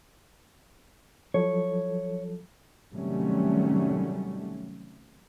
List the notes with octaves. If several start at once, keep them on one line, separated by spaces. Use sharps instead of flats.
F3 F#3 A4 C#5
C3 D#3 F#3 G3 A3 C#4